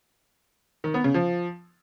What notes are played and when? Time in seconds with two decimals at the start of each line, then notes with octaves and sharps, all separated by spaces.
0.84 D#3
0.94 B3
1.04 C#3
1.14 F3